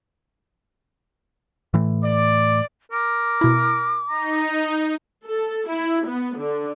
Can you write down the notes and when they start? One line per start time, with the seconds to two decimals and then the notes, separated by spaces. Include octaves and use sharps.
1.74 A2 E3 A3
2.04 D5
2.92 A#4 D6
3.41 B2 E4
4.09 D#4 A#5
5.27 A4
5.69 E4
6.07 B3
6.39 D3